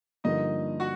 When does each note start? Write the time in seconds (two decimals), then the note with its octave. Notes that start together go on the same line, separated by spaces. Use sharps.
0.24 G2 D3 F3 A#3 D#4 D#5
0.80 F#4 F#5